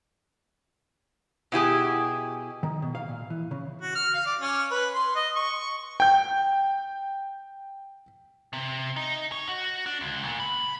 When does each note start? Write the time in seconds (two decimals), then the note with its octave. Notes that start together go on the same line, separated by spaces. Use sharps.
1.52 B2 E4 G4 G#4
2.63 D#3
2.82 B2
2.95 F5
3.09 A#2
3.30 E3
3.51 C#3
3.81 F#4
3.96 F6
4.14 F5
4.26 D5
4.41 C#4
4.71 B4
4.94 C6
5.15 D#5
5.36 C#6
6.00 G5 G6
8.53 C3
8.96 D#4
9.32 C#5
9.48 F#4
9.86 D4
10.01 C#2
10.24 A#2
10.40 B5